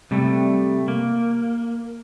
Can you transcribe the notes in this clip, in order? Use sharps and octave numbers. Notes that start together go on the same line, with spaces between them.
C3 G3 A3
A#3